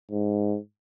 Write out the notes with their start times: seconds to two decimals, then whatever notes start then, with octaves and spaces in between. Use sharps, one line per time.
0.11 G#2